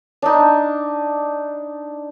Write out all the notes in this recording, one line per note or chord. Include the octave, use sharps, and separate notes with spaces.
D4 D#4